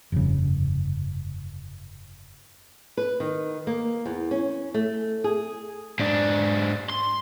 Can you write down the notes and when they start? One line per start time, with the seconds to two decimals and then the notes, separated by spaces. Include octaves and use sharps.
0.12 F1 G2 C#3
2.97 B4
3.20 D#3
3.67 A#3
4.06 E2
4.31 C#4
4.74 A3
5.24 G#4
5.99 G#2 D4
6.90 C6